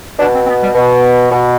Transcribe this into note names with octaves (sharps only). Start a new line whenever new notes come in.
B2 D4
C4
C4
B3
G3
B2
B2